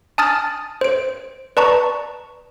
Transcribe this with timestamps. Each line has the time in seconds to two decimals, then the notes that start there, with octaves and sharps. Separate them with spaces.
0.18 G#5 A5 D#6 F6 A6
0.81 C5 D7
1.57 B4 D5 A5 A#5 C#6